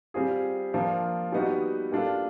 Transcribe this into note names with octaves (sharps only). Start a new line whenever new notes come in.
G3 C4 F4 G#4
F3 A#3 D4 F4 A#4
G3 B3 D#4 F#4
G3 A#3 D4 F4 A4